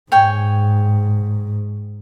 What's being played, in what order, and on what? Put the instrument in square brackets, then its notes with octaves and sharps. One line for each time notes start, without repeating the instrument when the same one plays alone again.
[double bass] G#2 [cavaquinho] C#5 G5 G#5